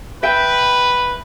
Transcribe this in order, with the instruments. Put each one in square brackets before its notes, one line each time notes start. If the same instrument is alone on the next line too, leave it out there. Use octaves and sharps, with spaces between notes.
[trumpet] B4 [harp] E5 G5